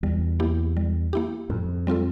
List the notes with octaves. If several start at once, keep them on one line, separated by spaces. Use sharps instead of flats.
E2 G3
A#3 E4 G4
G3
A#3 E4 G4
F2 A2
G3 C4 F4 A4